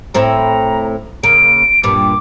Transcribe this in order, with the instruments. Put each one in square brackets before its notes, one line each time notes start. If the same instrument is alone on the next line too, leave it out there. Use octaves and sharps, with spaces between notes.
[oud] A2 C4 E4 [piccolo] A#5
[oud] C#3 A#3 [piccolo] D7
[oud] G2 A#2 [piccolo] D6